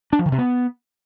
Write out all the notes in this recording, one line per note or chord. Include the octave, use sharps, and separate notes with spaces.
D4
F3
D#3
C3
B3